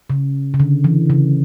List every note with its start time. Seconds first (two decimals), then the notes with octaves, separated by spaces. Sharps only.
0.10 C#3
0.54 C#3
0.60 D3
0.84 E3
1.10 C#3